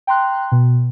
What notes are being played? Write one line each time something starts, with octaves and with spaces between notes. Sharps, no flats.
G5 A#5 C6 F#6
B2